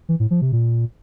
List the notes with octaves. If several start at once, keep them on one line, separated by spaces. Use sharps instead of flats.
E3
A2
F3
C3
A#2